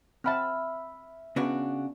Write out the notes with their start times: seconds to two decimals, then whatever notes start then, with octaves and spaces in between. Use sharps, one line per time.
0.24 C4 E5 F#5 A5 B5 F6
1.36 C#3 B3 D4 F#4